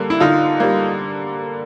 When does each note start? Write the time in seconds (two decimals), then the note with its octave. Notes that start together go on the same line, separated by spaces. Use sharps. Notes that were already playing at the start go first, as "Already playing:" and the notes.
Already playing: D3 G3 A#3
0.10 E4
0.20 D3 D#4 F4
0.60 G3 A#3